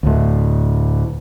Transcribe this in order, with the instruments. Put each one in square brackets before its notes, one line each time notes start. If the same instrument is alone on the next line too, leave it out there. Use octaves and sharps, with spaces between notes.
[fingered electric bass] D2 A2